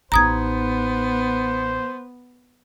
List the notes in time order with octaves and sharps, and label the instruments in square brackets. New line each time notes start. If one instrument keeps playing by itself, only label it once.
[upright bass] A1 D#4 [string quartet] B3 [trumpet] C5 [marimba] A#5 D#6 G#6